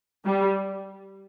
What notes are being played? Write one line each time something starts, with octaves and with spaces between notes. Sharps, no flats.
G3